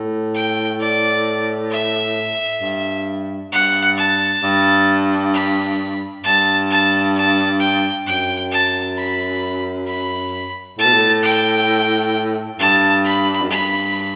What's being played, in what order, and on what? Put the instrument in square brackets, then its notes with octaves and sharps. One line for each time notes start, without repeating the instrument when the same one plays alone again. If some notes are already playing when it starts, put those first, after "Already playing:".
Already playing: [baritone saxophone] A2
[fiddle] G5
D5
E5
[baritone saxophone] G2
[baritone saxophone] G2 [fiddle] F#5
[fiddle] A5
[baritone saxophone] G2
[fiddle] B5
[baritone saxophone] G2 [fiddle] A5
[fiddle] A5
A5
G5
[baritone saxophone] F#2 [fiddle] G5
[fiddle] A5
B5
B5
[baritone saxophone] A2 [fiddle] A5
[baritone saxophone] B2
A2
[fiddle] G5
[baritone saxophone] G2 [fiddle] A5
[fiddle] B5
[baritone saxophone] F#2
[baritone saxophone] G2 [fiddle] B5